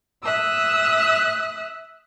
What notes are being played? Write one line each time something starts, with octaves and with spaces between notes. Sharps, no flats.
E5 D#6 E6 F#6